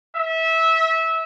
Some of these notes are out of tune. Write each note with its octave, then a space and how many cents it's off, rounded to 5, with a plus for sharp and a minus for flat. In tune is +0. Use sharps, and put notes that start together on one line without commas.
E5 -20